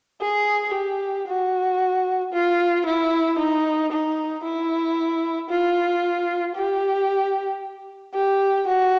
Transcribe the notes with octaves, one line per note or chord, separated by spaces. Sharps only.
G#4
G4
F#4
F4
E4
D#4
D#4
E4
F4
G4
G4
F#4